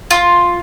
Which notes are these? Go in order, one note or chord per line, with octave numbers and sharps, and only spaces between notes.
F4